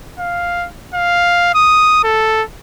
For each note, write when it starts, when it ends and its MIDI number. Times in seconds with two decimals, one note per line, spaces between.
0.19 0.68 77
0.94 1.54 77
1.55 2.02 87
2.04 2.43 69